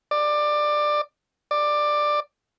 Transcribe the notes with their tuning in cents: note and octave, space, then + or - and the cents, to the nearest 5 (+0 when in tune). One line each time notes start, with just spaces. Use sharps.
D5 +20
D5 +15